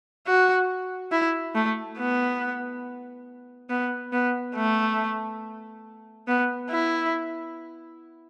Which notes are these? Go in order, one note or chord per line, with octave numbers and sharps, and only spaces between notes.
F#4
E4
A3
B3
B3
B3
A3
B3
E4